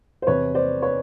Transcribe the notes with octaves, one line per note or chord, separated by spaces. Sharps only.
C5
E2 C3 E3 B4 C#5
C5 D5
B4 C#5